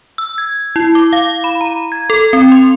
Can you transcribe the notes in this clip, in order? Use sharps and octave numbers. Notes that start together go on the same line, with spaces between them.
E6
G#6
E4
D6
F5
B5
A#5
G#6
A4
C4
C6